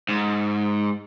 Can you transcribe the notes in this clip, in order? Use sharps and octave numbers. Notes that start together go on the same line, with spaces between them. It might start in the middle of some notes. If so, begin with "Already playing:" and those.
G#2